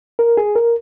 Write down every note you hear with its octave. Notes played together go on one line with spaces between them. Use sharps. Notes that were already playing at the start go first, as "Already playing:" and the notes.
A#4
G#4
A#4